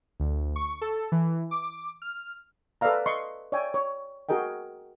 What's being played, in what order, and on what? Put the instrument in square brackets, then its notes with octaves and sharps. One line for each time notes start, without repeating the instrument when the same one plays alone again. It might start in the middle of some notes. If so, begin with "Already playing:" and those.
[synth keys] D2
C#6
A4
E3
D6
F6
[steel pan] A4 B4 D5 E5 F5 A#5
D#5 C6 C#6
C#5 D5 E5 G5 G#5
C#5
F#4 G#4 A#4 D#5 G5